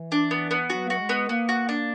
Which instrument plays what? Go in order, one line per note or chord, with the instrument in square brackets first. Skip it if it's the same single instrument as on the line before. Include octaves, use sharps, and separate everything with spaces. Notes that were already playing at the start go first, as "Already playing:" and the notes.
Already playing: [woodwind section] E3
[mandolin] D4
B3
B3
[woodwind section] F#3 [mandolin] F#4
[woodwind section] A#3
[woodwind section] A3 [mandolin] F#4
[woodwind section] G#3
[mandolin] B3
[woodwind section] A#3 [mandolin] B3
[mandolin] F#4
D4